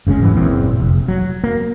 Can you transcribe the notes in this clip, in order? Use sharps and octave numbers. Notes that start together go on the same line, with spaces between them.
F#1 C#3 G#3 C#4
G#2 E3 F#3
F#1 E2 A#2 C4
F1
F#3
A#3